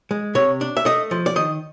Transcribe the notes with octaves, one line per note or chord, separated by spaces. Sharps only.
G#3
C3 C#5
D4
E5
A3 D#5
F3
D5
D#3 D#5